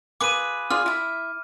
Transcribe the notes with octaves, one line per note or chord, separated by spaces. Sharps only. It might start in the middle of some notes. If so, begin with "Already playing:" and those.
F4 G#4 B4 D6 D#7
F4 G#4 D5 F6
E4 E5